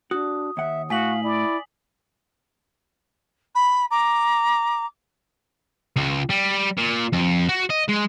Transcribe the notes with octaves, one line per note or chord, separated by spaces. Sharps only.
D4 F#4 D#6
D#2 E5 F#5
A2 F#4 F5 G#5 B6 F#7
E4 D5
B5
A#5 D6
C#2
G3
A#2
F2
F#4
D#5
G#3